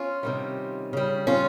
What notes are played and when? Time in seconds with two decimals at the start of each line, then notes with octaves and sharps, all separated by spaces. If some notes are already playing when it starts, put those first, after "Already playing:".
Already playing: C#4 F4
0.23 C3 D#3 G3
0.93 C#3 G3
1.27 C#4 F4